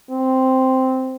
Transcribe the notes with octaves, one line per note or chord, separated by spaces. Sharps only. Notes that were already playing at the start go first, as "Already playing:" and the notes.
C4